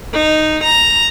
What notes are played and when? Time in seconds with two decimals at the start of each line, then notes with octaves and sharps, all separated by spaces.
0.13 D#4
0.64 A#5